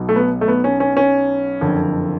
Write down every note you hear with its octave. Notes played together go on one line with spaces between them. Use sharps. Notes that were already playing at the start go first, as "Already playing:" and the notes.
Already playing: B1 B2
A3
B3
A3
B3
C#4
C#4
C#4
F#1 F2 D3